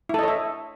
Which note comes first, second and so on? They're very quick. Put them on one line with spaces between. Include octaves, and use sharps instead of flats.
E4 A4 D#5 C#5 E5